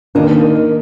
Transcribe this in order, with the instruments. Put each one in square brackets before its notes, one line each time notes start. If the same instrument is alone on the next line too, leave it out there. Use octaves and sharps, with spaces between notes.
[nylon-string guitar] D#3 [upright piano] A#3 D4